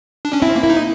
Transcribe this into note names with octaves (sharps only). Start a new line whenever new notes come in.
D4
C#4
C4 E4
A#3
E4
D#4